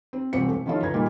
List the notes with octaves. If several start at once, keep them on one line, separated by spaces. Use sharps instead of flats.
C4
E1 C2 C4 C#7
A3
D#3 F3 C#4 E4 F4 A4
C#2 B4 A#5 G#6
A#2 D#3 G3 A#3